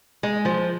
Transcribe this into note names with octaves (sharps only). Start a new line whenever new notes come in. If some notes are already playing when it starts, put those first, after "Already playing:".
G#3
F3